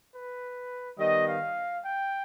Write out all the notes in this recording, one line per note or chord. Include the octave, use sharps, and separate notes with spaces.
B4
D#3 G3 B3 D#5
F5
G5